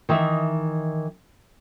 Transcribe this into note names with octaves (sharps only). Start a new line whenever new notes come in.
D#3 E3 D#4 E5